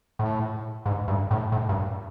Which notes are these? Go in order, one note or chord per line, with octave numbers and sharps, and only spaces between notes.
A2
G#2
G2
A2
A2
G2